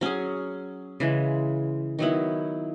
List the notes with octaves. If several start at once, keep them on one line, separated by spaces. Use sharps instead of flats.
F#3 C#4 G#4
C#3 E3 G#3
D#3 F#3 B3 E4